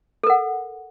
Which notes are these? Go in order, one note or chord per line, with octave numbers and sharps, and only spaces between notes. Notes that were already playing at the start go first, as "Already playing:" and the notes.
A4 A#4 F#5